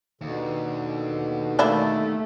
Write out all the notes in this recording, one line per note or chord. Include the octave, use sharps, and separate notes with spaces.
D#2 B2 D3
A3 A#3 D4 E4